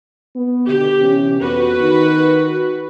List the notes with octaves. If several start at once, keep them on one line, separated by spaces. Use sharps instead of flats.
B3
B2 D3 G4
C3 E3 C#4
F2 B3 F#4 B4
D#3 D#4